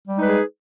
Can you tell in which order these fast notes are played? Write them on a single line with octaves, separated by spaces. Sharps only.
G3 G#3 D#4 B4 G#4